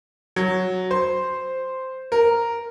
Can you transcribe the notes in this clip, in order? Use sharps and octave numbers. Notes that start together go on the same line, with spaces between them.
F#3
C5
A#4